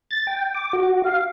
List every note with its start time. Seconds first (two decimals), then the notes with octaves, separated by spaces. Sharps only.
0.11 A6
0.27 G5
0.54 D6
0.73 F#4
1.04 F5